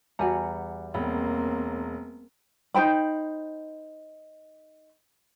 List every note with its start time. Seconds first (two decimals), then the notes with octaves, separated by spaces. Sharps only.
0.19 E2 G3 F#4 F#5 G#5 A#5
0.94 E1 A#3 C4 C#5 G5 B5
2.74 D#4 C5 G5 B5